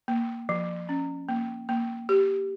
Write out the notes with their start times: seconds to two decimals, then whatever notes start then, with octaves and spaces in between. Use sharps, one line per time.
0.08 A#3
0.49 F3
0.89 C#4
1.29 A#3
1.69 A#3
2.09 G4